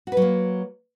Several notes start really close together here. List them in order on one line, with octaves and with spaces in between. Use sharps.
F#4 B4 F#3 A#3